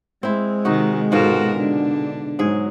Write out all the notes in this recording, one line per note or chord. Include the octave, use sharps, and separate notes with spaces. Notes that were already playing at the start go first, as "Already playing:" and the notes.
G#3 C4 E4
C3 D#3 D#4 F#4
G#2 B2 F4 F#4 A4 A#4
D3 D4
G#2 F#3 G#3 G#4